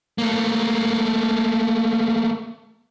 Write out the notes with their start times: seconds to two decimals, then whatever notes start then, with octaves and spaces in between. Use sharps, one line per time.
0.18 A3 A#3